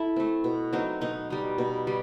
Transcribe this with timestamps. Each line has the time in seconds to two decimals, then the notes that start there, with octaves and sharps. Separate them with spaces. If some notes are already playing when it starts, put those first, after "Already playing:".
Already playing: E4 A4
0.16 A3 C4
0.44 B2
0.73 F#3 C4 D#4
1.01 B2 D#4
1.30 G3 D#4
1.58 B2
1.87 G3